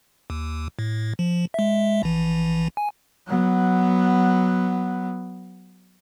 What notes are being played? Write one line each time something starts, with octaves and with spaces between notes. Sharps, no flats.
D#2
A2
F3
G#3 E5
A#1 E3
G#5
F#3 B3